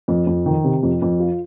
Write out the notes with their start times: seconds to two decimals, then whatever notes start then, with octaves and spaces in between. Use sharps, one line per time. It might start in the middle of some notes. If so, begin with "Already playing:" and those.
0.08 F2
0.27 F2
0.46 D#3
0.64 C3
0.83 F2
1.02 F2
1.20 F4